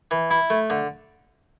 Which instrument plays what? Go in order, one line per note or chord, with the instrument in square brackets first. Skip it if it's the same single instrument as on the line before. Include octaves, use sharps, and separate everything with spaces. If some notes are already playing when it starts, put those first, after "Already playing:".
[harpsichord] E3
E4
A3
D3